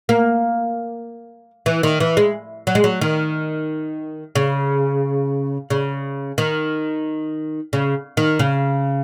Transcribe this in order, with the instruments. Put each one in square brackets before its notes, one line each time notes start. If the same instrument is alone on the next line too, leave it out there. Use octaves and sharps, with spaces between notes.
[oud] A#3
E3
D#3
E3
G#3
F#3
G#3
F#3
D#3
C#3
C#3
D#3
C#3
D#3
C#3